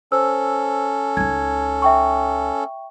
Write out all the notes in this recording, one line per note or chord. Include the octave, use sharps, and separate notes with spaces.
C#4 A4 C5 E6
C#2 D#4 G#6
E5 G5 C#6